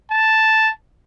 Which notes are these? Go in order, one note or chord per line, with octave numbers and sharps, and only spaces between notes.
A5